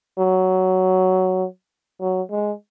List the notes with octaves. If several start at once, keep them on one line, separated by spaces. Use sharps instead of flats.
F#3
F#3
G#3